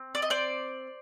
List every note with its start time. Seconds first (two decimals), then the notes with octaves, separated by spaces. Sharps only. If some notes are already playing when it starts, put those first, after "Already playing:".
Already playing: C4
0.15 D5
0.22 D#5
0.30 C5 D5